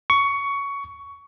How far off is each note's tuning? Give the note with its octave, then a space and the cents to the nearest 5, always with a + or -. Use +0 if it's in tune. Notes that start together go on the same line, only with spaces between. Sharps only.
C#6 +15